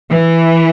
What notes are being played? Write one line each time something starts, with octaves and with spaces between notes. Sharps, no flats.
E3